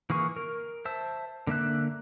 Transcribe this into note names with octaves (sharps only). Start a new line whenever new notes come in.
E3 A#3 G#4 C#6
A#4
C5 E5 A5 E6
D3 A#3 E5 F#6